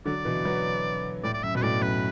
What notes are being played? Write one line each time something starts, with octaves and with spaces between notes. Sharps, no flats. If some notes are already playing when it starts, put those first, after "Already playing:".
D3 F#3 D5
B2 E3
F#3 B3
A2 D5
D5
F#2 E5
B2 B4
A2 D5
F#2 B4